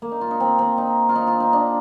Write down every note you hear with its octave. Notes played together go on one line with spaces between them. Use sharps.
A#3
D#4
F4
D#4
C4
C4
D#4
F4
D#4
F4
D#4
D4